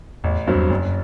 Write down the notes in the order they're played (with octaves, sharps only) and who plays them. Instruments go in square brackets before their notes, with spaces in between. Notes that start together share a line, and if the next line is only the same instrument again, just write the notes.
[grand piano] A1 [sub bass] E2
[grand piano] G2 F#3 C4
[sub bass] E2
[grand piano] F#1 [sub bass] F#2